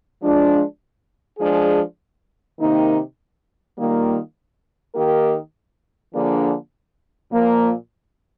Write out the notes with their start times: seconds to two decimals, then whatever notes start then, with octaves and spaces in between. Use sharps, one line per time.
0.21 F3 G#3 D4 F4
1.39 F3 G#3 D4 G#4
2.58 C3 D#3 A#3 D#4
3.77 D#3 G3 A#3 F4
4.94 D#3 A#3 D#4 G4 A#4
6.13 D3 F3 A#3 D4 G#4
7.32 A#2 F3 A#3